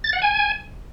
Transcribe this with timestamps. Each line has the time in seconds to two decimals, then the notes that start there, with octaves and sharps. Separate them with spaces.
0.04 A6
0.13 F#5
0.22 G#5